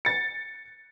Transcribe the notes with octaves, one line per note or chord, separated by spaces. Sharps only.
A6 C#7